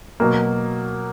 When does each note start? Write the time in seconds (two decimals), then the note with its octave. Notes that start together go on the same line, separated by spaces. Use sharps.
0.20 B2 F#3 A#3